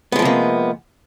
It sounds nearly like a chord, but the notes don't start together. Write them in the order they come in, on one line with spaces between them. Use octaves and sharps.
B3 G#3 F3 C3 A#3